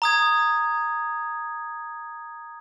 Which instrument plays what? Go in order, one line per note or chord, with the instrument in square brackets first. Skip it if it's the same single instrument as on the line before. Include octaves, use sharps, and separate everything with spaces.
[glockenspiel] A#5 D#6 G#6